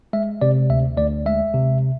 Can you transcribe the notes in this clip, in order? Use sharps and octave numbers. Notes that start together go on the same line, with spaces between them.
G#3 E5
C3 D5
D2 E5
D2 D5
G#3 E5
C3